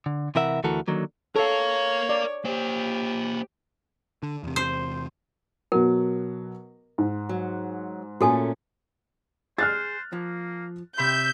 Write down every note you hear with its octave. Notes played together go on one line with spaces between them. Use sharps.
D3
C3 E3 A#4 E5 F#5
D2 E3 F#4 A4 A#4
D3 D#3 F#3 A#3
A4 A#4 C#5 F5
D5
A#3 G4 C5
D3
E2 C3
C5
B2 F#3 A#4
G#2
F#3
A#2 A3 C#4 F#4 A4 G#5
G#4 C5 F6 F#6 A6
F3 A#3
C3 E5 B5 C6 G6